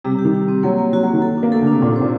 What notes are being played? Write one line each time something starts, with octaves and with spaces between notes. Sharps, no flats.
C3 G3
C3
G4
D#3
G4
C4
F#3 A#3
A#3
F#3 F#4
F#3
A#3
D#3
A4
D4
A#3
A3 A4
D3
D4
C3
A#2 D#4
C3
C5
A#2